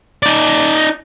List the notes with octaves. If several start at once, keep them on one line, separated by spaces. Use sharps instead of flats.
D#4 D5